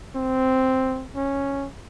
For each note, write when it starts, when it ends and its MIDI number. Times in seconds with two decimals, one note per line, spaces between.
0.15 1.06 60
1.16 1.68 61